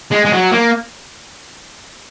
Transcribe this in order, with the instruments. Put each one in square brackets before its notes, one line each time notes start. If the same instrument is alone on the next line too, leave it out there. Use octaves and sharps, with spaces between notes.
[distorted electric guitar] G#3
G#3
F#3
A#3